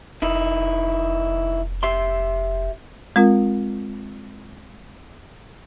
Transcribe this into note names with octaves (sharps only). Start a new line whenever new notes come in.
F1 D#3 D#4 E4
G4 E5 C6
G#3 C4 F4 A#4